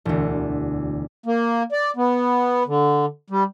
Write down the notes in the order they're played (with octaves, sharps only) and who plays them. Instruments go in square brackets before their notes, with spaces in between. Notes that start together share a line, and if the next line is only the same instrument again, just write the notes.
[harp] E1 D2
[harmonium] A#3
D5
B3
D3
G3